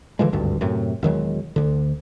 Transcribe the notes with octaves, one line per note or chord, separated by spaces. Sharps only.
D3 E3 F3 G#3
G#1 D2 G2
F#2 A2 C3
E1 D#3 F#3 G#3
D2 D3